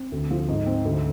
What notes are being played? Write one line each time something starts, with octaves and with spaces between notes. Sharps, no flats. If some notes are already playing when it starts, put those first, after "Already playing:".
Already playing: C4
D2
F3
G#2
C4
D2